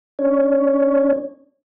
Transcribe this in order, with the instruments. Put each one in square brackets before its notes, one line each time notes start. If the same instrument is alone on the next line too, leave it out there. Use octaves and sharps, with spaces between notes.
[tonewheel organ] C#4 D4 C#5